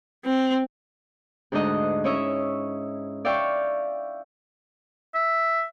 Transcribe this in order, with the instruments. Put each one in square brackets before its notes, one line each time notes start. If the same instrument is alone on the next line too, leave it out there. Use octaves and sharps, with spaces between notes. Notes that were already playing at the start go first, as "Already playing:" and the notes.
[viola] C4
[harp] D2 G#2 D4 D#4 D#5 F#6
C#4 E4 C#5 D#5 E5
D5 E5 F5 G5 C#6
[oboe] E5